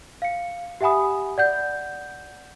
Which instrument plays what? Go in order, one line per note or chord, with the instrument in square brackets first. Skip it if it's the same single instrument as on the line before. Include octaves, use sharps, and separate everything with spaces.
[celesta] F5 C#7
G4 E5 F#5 G#5 B5 D#6
D5 F#5 G6